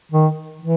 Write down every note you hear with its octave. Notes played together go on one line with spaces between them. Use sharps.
D#3
E3